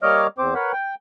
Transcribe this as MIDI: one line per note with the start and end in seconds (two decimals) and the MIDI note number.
0.03 0.27 55
0.03 0.27 58
0.03 0.27 73
0.03 0.27 75
0.03 0.27 86
0.03 0.27 89
0.38 0.54 40
0.38 0.54 60
0.38 0.54 72
0.38 0.54 86
0.54 0.72 70
0.54 0.72 71
0.54 0.72 73
0.54 0.72 78
0.54 0.72 83
0.73 0.95 79